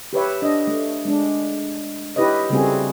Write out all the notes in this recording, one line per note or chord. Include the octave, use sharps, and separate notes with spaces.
G4 B4 C#5 E5
D4 D#5
A3
G#3 D4
E4 G4 B4 C#5 D#5
C#3 G3 A3 C4 F#4 G#4